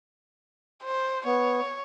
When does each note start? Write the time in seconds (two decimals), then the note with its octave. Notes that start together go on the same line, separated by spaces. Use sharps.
0.84 C5
1.26 B3 C#5